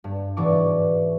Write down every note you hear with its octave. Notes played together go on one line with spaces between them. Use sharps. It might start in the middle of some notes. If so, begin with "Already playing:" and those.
G2
G#2 B2 E3 D5 C#6 D6